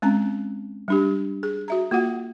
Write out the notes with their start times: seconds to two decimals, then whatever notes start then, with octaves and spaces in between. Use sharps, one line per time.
0.02 G#3 C4 C#4 A#5
0.88 G3 D4 G4
1.43 G#4
1.68 F#4 E5 A#5
1.91 A#3 F4 F#4 F#5